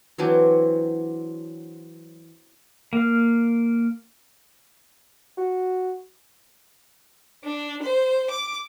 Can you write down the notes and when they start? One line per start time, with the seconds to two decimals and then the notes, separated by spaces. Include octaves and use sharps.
0.18 E3 F#3 C4 D4
2.93 A#3 F5
5.38 F#4
7.45 D4
7.83 C5
8.31 D6